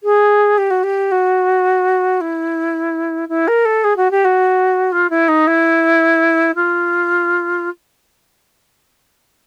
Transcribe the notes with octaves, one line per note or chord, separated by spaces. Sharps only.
G#4
G4
F#4
G4
F#4
E4
E4
A#4
A4
G#4
F#4
G4
F#4
F4
E4
D#4
E4
F4